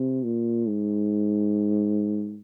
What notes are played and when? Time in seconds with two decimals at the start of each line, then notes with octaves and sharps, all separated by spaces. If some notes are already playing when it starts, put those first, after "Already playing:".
Already playing: C3
0.25 A#2
0.68 G#2